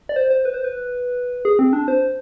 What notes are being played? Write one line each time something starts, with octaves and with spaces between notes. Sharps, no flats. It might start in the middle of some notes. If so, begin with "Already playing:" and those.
D5
C5
C5
B4
C5
B4
G#4
C4
D4
C5